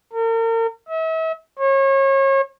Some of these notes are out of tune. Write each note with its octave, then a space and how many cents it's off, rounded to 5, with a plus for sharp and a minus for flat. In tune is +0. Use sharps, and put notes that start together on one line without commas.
A#4 -40
E5 -40
C#5 -35